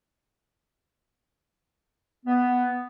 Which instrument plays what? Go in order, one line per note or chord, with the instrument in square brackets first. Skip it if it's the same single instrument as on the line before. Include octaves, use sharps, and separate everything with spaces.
[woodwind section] B3